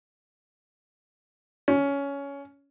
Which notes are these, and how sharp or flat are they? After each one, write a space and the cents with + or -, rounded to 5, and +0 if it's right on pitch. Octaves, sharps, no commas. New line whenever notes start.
C#4 +15